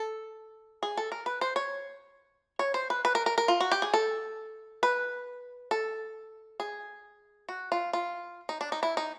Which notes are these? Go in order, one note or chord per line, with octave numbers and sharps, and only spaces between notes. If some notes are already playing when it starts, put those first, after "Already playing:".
Already playing: A4
G#4
A4
A#4
B4
C5
C#5
C#5
C5
B4
B4
A#4
A#4
A#4
F4
F#4
G4
G#4
A4
B4
A4
G#4
F#4
F4
F4
D#4
D4
D#4
E4
D#4